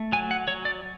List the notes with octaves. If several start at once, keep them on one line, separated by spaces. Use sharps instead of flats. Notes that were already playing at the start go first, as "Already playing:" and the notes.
Already playing: A3
F#3 G#5
F#5
F#3 C#5
D5